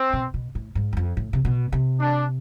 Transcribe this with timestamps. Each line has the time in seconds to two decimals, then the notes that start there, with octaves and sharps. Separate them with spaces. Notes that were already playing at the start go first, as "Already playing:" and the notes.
Already playing: C4
0.13 B2
0.34 B2
0.55 A2
0.75 G#2
0.93 E2
0.97 F2
1.17 A2
1.33 C3
1.45 B2
1.72 C3
2.00 D4